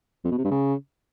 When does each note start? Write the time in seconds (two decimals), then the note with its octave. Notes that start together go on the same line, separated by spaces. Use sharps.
0.25 F2
0.31 B2
0.38 C3
0.44 G2
0.51 C#3